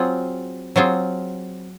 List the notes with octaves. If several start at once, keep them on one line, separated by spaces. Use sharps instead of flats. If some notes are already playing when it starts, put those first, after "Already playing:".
Already playing: F#3 C4 F4 G#4
F#3 C4 F4 G#4